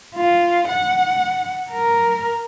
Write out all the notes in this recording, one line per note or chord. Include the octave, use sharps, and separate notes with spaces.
F4
F#5
A#4